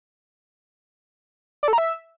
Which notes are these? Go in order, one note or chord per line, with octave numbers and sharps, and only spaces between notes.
D5
A4
A#5
E5